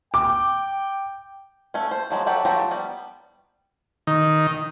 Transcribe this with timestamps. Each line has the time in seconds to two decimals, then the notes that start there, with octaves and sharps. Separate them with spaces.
0.14 G5 D6
1.74 A3 C#4
1.91 C5
2.10 F3 F#3 G#3
2.27 F#3 F#4 G4 A4 B4
2.45 F3 F#3 A3 G4 A#5
2.71 G3 B3
4.07 D#3